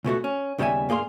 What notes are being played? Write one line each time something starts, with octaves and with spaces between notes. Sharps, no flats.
C#2 B2 A3 F#4
C#4
D#2 C#3 G3 B3 E5 G#5
G2 A#3 G#4 F5 C6